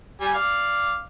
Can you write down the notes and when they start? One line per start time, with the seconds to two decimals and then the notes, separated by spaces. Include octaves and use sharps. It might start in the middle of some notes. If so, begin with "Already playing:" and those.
0.21 G3 G#5
0.34 D5 F5